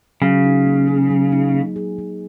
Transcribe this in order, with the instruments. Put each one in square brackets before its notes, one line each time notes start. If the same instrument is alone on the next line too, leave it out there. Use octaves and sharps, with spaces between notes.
[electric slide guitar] C#3 [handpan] F#3
[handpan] D#4
A#3
G#4
F#3
D#4
A#3
G#4
F#3